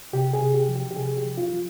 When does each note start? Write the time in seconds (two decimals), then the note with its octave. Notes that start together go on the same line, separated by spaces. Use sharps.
0.13 C3 G4
0.34 G#4
0.40 C3
0.54 G4
0.68 F3
0.76 G4
0.91 G4
0.96 C3 G#4
1.17 G4
1.24 F3
1.38 F4
1.52 F3